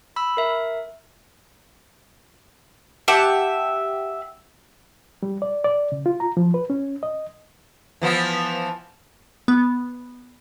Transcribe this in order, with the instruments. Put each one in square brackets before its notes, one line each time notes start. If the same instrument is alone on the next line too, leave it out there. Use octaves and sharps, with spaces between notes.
[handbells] B5 E6
A#4 E5
[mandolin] G4 E5 F#5 A5
[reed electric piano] G3
D5
D5
C#3
F4
A#5
F3
B4
C#4
D#5
[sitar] E3 F3 B3
[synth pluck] B3